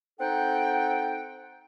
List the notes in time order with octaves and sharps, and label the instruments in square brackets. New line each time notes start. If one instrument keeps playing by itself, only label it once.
[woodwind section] C4 D#4 A4 F#5 G5